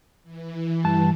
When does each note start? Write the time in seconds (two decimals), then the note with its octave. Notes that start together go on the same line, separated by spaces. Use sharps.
0.24 E3
0.84 G2 A5